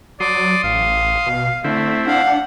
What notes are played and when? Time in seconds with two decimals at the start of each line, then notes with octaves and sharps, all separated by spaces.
0.20 F#3 D5 C6 D#6
0.64 A1 F5
1.26 B2
1.64 D3 A3 C4 E4
2.07 D4 F5 F#5